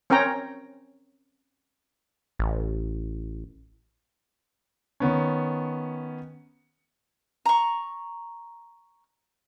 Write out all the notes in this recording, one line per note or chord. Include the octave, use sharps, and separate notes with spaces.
C4 C#4 A#4 C#5 G5 A#5
A1
D#3 B3 C#4
A#5 C#6